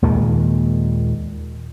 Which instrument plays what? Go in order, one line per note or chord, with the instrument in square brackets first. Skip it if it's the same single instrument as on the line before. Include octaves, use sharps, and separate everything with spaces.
[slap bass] D#2 A#2 D#3 G#3